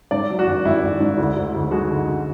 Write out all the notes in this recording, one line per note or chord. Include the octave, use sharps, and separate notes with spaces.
G#2 D5
F#3
F#4
G#1
G#1 E4
G#1
G#2
D2
D2
D2
G#3 F#4
D3
D3